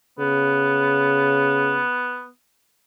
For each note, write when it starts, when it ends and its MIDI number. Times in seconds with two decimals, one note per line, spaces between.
0.19 1.82 49
0.19 2.28 59